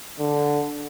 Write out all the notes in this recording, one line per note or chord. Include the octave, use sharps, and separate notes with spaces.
D3